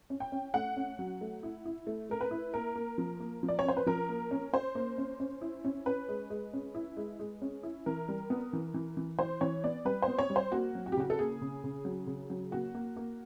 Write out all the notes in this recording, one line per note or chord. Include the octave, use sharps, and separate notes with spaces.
C#4
G5
C#4
A3 F#5
C#4
F#3
A3
E4
E4
A3
A3 A#4
B4
E4
A#3 A#4
A#3
F3
A#3
F3
D5
C#5
C#4 C5
B4
F3 A#4
A#3
C#4
C#4 C5
A#3
C#4
C#4
E4
C#4
C#4 B4
G#3
G#3
C#4
E4
G#3
G#3
C#4
E4
E3 A#4
G3
B3
E3
E3
E3
E3 C5
E3 C#5
B3 D5
G3 B4
C5
B3
C#5
G3
C5
A#3 F#4
F#3
F#4
G4
C#3 F#4
A4
A#3 G#4
C#3
C#3
F#3
C#3
F#3
A#3 F#4
A#3
A#3